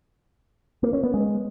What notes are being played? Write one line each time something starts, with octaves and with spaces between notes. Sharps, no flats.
A#3
C#4
B3
G#3